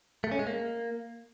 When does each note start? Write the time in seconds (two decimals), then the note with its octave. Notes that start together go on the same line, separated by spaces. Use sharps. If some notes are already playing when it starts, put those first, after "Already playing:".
0.24 A3
0.32 C#4
0.39 G#3
0.47 A#3